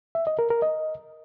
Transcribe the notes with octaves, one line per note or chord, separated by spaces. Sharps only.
E5
D#5
A#4
A#4
D#5